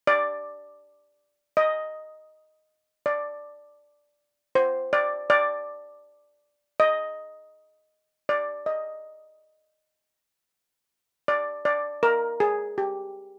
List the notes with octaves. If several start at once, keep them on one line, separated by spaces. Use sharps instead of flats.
D5
D#5
D5
C5
D5
D5
D#5
D5
D#5
D5
D5
A#4
G#4
G4